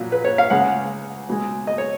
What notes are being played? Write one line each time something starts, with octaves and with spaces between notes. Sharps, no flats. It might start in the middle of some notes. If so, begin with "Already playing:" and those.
Already playing: A#1 A#2 F#3
B4
C#5
F5
C#2 C#3 G#3 F#5
C#2 B2 G#3
D#5
C#5